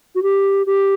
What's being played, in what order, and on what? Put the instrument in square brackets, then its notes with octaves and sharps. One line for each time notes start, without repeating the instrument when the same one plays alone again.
[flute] F#4
G4
G4